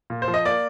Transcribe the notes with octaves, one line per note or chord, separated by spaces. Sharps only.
A#2
C5
F3
D#5
A#3 D5